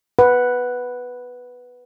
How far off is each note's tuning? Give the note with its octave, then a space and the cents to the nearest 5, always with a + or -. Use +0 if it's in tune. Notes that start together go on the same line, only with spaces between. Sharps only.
B4 +0 F#5 +0